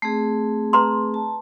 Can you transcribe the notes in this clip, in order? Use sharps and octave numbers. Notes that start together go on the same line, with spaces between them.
A3 C4 G#4
B4 A#5 C6
A5